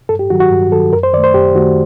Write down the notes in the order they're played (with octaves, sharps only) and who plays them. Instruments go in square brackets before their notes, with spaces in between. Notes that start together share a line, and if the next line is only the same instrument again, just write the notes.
[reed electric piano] G2 A4
G4
D#3 F#3 F#4
F#4
G2
D#3 F#3 A4
F#2 A#4
C5
D#3 D5
A3
C5
F#2 G4
D#3 A3 F#4